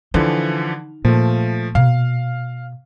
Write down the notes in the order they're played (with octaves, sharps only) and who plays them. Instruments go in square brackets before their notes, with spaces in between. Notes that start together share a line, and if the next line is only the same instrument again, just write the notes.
[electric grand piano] D3 E3 F3 [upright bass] D#4
[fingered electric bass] A#2 [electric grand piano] F3 A3
[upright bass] B2 [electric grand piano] F5